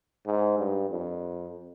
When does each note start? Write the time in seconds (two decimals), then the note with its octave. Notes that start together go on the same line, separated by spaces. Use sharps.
0.26 G#2
0.58 G2
0.90 F2